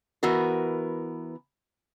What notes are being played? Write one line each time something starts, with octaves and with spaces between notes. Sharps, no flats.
E3 B3 F#4 A#4